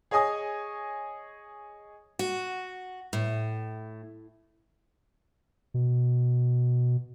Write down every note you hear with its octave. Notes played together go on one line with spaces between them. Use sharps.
G#4 C#5 D#5 G#5 D#6
F#4
A2
B2